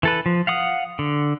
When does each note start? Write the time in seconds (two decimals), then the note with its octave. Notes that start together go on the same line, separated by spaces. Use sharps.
0.03 E3 A4 B4
0.26 F3
0.47 F5 F#5 D#6
0.99 D3